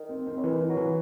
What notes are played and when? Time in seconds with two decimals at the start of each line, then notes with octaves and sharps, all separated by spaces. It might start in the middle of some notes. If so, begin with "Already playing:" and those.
Already playing: D#3
0.09 C4
0.27 C4
0.37 C#3
0.43 D#3 E3
0.60 E3
0.69 F#3
0.77 E3